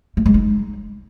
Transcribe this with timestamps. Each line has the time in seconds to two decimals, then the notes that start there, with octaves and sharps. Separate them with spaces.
0.17 A3
0.26 G#3
0.34 D#4